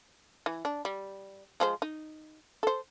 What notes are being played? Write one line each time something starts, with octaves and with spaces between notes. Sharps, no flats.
E3
D4
G3
F3 G#3 C5
D#4
A4 C5